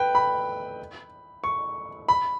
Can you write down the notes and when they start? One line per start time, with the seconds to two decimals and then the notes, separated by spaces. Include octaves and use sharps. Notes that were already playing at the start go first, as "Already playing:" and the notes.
Already playing: B4 G5
0.15 B5
1.44 C#6
2.08 B5